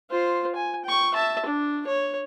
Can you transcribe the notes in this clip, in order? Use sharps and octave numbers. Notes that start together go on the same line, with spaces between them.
F4 C5
G#5
G5 C#6
E5 A5
D4
C#5